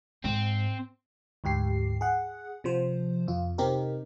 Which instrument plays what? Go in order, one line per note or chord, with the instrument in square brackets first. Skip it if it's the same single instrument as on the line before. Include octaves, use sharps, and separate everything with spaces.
[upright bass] G#2 [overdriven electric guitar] C4
[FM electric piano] D2 G#2 G4 C7
G#4 F#5
C3 F3 C5
F2 F4
C3 C4 D#4 G4 A#4